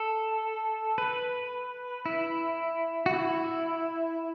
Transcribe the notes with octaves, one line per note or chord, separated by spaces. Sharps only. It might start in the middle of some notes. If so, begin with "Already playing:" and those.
Already playing: A4
B4
E4
F#4
E4